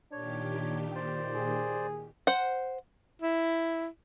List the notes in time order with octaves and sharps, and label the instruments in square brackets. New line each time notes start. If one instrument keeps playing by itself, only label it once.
[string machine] A#2 D#3 G4 [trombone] D4 [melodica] C#5
[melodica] C5 D5
[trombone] G#4
[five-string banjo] C5 F#5
[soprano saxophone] E4